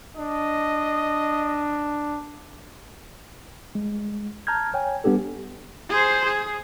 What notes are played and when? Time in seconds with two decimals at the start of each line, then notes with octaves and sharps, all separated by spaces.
0.17 D4 D#5
3.75 G#3
4.47 A5 A#5 F6 G6 G#6
4.74 C#5 G5 G#5
5.04 G3 B3 D4 G4 A4
5.90 G#4 C5
6.26 G#4